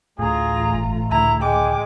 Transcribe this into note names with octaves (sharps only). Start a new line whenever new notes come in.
A1 D2 A2 A3 F4 G#4 A#5
G1
C#2 D3 E4 A#5
G#3 G5 D6